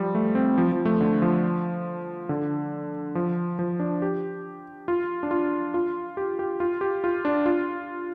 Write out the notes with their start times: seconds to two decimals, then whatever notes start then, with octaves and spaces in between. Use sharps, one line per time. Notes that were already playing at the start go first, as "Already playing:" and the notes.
Already playing: F3 G3
0.15 A3
0.35 C4
0.58 F3
0.72 F3
0.85 A3
1.01 D3
1.22 F3
2.29 D3
3.15 F3
3.59 F3
3.80 D4
4.02 G4
4.88 F4
5.23 D4
5.31 F4
5.74 F4
6.17 G4
6.39 G4
6.60 F4
6.81 G4
7.04 F4
7.25 D4
7.46 F4